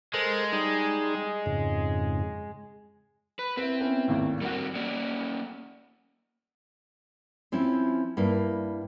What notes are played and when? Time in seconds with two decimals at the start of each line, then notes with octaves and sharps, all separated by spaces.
0.14 G#3 A4 A#4 C5
0.53 G3 D#4 G#4
1.46 F2 G#2 C#3
3.39 B4
3.57 C4 E4 B4
3.80 B3 C#4 E4
4.08 G#1 D#2 A2
4.41 G3 C4 F#4 A#4 F#5
4.75 A#3 C#4 D5
7.52 F3 C4 C#4 E4
8.17 G2 A#3 E4